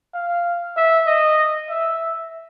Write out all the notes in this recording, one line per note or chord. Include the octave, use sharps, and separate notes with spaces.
F5
E5
D#5
E5